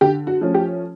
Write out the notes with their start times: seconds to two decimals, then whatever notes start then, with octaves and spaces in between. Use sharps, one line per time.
0.01 D3 G4
0.27 F#4
0.41 F3 A3 C#4
0.54 G4